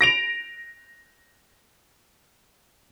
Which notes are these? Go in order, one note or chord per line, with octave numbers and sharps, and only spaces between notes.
A#6 D7 F7